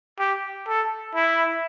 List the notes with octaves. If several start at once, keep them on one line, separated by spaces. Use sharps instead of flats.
G4
A4
E4